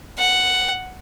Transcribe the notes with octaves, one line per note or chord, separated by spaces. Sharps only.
F#5